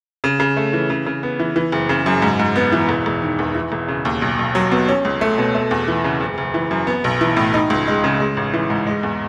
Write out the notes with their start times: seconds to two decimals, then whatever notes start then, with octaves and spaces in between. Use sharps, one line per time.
0.24 C#3
0.40 C#3
0.57 A3
0.73 E3
0.90 C#3
1.06 C#3
1.23 B3
1.40 E3
1.56 E3
1.72 F#1
1.89 C#3
2.06 F#2
2.22 G#2
2.39 G#2
2.56 B3
2.72 E3
2.89 E1
3.06 E1
3.22 D#3
3.39 E2
3.55 E3
3.72 E1
3.88 C#3
4.05 D#2
4.22 B1
4.39 B1
4.55 F#3
4.72 B2
4.89 C#4
5.05 C#2
5.21 A3
5.38 B2
5.55 A3
5.71 E2
5.88 E3
6.04 C#3
6.21 F#1
6.38 F#1
6.54 E3
6.71 F#2
6.87 B3
7.04 B1
7.21 E3
7.37 A2
7.54 D#4
7.70 C#2
7.87 G#3
8.04 C#3
8.20 G#3
8.37 A1
8.54 E3
8.70 G#2
8.87 G#3
9.03 E2